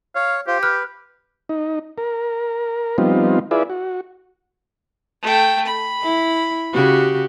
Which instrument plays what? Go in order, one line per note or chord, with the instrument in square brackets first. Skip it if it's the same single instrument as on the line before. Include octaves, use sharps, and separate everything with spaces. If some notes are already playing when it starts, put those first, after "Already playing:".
[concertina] C#5 [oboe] F5
[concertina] F4 C5 [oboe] G4
[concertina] B4 [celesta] F6 F#6
[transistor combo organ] D#4
A#4
F3 G3 B3 C4 D#4 F4
E4 F4 G#4 B4 D5 E5
F#4
[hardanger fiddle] A3 G5
B5
[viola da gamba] E4
C#3 F#4 G4